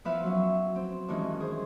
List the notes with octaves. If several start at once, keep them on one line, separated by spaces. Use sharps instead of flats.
F3 B3 E4 B4 E5 F5
F#3 C#4
C4
G2 D#3 E3 G#3 C#4
G#4 C5